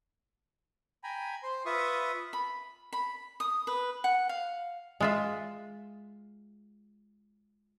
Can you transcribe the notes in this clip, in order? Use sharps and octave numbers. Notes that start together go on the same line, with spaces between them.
G5 G#5 A#5 B5
C5 C6
F4 B4 E5 C#6 D#6
B5
B5
D#6
B4
F#5
F5
G#3 F4 E5